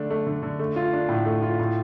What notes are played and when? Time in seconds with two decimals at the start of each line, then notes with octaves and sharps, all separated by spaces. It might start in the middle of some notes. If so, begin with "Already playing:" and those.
Already playing: D3 A3 D4
0.10 A3
0.27 D3
0.43 D3
0.59 A3
0.76 F4
0.93 D4
1.09 A2
1.26 A3
1.42 F4
1.60 A2